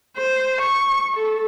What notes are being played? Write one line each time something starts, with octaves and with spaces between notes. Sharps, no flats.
C5
C#6
A4